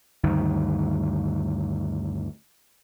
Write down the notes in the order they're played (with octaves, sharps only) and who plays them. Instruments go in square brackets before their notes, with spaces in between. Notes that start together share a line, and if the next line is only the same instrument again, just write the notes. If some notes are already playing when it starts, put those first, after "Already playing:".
[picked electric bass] D2 G2 D#3